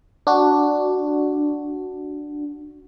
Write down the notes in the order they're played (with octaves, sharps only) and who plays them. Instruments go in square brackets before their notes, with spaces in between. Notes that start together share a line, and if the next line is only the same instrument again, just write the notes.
[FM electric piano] D4 F#4